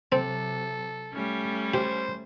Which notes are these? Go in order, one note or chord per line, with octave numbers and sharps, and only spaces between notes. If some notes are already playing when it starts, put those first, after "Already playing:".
C3 F#3 C4 A4
G3 A3 C#4
G4 C5